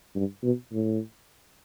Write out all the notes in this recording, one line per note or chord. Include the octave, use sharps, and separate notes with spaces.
G2
B2
A2